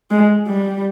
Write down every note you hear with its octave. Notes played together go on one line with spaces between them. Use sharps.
G#3
G3